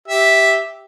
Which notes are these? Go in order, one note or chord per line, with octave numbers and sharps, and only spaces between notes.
G4 E5